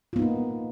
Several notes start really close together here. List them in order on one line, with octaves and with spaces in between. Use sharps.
F4 B3 D#4 A#3